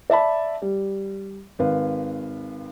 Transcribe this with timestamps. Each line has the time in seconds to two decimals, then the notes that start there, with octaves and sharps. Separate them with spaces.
0.10 D5 E5 A5 B5
0.62 G3
1.59 G#1 B4 F5